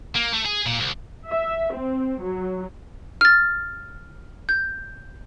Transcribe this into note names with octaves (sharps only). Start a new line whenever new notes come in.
A#3
A3
G#4
A#2
C2
E5
C4
F#3
F6 A6
G6